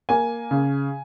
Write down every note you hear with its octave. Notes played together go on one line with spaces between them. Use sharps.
A#3 G#5
C#3